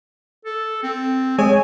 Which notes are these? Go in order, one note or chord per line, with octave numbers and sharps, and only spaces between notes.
A4
C4
G#3 C#5 G#5